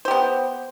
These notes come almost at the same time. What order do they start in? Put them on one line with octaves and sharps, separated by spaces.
C5 G4 B3